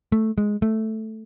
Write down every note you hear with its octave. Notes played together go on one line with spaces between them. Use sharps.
A3
G#3
A3